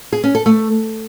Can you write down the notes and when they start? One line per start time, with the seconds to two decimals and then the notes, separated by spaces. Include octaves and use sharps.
0.13 G#4
0.24 C#4
0.35 A4
0.46 A3